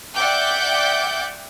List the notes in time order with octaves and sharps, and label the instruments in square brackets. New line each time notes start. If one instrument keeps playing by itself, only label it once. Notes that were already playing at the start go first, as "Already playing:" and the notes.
[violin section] D5 E5 F#5 G5 D6 G6